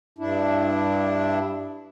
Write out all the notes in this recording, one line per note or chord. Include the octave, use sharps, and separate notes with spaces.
G2 D4 E4